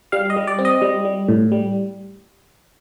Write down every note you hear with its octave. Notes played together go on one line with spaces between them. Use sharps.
G3 F5
D#5
G3
D5
C4
D#5
G3
G3
A2
G3